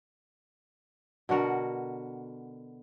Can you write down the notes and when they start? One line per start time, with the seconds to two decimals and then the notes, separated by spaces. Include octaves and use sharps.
1.29 B2 D3 F#4 A#4